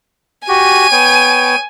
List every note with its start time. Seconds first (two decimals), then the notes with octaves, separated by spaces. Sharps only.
0.48 F#4 G4 G#5 D#7
0.92 B3 C#5 G5